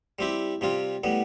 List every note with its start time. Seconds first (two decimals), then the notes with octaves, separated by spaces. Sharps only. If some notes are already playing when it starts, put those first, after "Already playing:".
0.19 G3 C4 E4 G4
0.61 C3 G3 C4 F4
1.04 A2 G3 B3